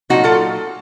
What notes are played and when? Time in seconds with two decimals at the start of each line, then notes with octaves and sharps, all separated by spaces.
0.10 A#2 F#3 A3 D#4 F#4
0.24 F4 A4